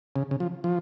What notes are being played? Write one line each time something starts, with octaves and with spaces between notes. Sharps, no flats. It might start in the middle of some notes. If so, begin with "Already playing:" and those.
C#3
C#3
F3
F3